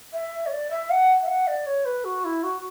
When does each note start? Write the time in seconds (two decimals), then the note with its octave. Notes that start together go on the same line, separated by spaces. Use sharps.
0.13 E5
0.46 C#5
0.51 D5
0.71 E5
0.90 F#5
1.22 E5
1.27 F#5
1.47 D5
1.66 C#5
1.85 B4
2.04 F#4
2.24 E4
2.43 F#4